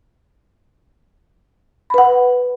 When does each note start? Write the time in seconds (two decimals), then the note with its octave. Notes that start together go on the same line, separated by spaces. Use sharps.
1.90 B5
1.94 B4
1.98 F#5